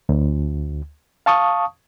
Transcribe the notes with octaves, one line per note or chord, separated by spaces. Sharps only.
D2
F5 A5 C#6 D#6